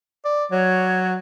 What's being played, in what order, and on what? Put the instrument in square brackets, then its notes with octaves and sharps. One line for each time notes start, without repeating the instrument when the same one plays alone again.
[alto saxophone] D5
[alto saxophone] F#3 [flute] C#5